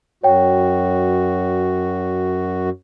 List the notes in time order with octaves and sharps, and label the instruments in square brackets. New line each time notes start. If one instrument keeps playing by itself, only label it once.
[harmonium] F#2 F#4 [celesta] C#5 G5